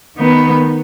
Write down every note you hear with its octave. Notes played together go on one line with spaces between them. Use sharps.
D#3 B3 D#4 B4